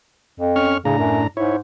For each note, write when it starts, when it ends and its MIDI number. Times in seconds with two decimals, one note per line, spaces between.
0.40 0.75 41
0.56 0.78 61
0.56 0.78 85
0.56 0.78 89
0.85 1.27 45
0.85 0.95 49
0.85 1.27 62
0.85 1.27 82
0.98 1.22 42
1.37 1.58 44
1.37 1.56 64
1.37 1.56 73